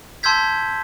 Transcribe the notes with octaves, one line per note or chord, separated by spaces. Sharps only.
A5 C6 E6 G6 G#6 B6